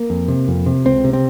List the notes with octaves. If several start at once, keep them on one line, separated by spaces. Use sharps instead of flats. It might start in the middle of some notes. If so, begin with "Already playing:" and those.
Already playing: A#3
F2
C3
F2
C3
C#2 C4
C3
C4